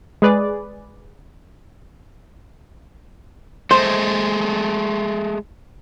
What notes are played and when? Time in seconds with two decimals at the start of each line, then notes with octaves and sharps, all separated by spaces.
0.22 G#3 G#4 B4 D5
3.71 G#3 A3 C5